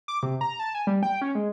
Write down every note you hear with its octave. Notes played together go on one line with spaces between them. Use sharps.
D6
C3
A#5
A5
G#5
G3
G5
C#4
G#3